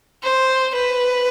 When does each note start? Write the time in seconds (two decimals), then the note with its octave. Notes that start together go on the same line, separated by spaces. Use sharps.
0.23 C5
0.75 B4